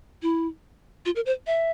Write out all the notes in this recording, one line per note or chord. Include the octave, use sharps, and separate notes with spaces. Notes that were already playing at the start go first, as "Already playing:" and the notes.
E4
F4
A#4
C5
E5